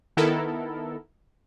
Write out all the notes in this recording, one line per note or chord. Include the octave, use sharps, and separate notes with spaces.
D#3 B3 E4 A4 A#4